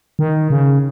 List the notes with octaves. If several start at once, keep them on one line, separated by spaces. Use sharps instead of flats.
D#3
C#3